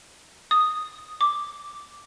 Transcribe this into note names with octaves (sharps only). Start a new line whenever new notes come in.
D#6
D6